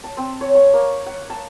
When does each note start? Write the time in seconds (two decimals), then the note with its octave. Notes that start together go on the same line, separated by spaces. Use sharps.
0.04 A5
0.17 C4
0.41 C#5
0.55 C#6
0.74 A#3
1.06 F#5
1.30 A5